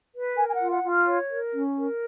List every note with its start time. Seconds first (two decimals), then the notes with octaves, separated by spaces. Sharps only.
0.13 B4
0.36 A#4 G#5
0.48 G#5
0.54 F#5
0.60 F4
0.71 F#5
0.83 F4
0.89 F6
1.06 C#5
1.29 A#4
1.53 C#4
1.77 A#4